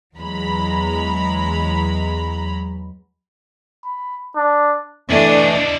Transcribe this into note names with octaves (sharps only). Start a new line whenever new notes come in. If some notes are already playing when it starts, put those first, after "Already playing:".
E2 F#3 G#3 A#5 B5
B5
D4
E3 A3 D4 E4 D#5